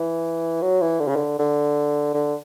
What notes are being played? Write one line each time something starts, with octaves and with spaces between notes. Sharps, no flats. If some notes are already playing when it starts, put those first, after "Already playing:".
Already playing: E3
F#3
E3
D3
C#3
D3
D3
D3